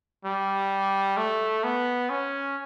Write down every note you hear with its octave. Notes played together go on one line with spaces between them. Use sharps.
G3
A3
B3
C#4